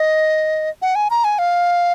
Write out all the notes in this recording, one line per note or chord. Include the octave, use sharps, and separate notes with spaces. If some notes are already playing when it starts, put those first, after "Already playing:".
Already playing: D#5
F#5
G#5
A#5
G#5
F5